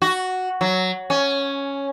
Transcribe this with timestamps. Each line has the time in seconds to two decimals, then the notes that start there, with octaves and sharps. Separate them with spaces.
0.02 F#4
0.61 F#3
1.10 C#4